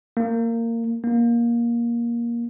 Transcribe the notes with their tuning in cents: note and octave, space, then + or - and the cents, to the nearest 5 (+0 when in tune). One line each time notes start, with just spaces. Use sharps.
A#3 -20
A#3 +15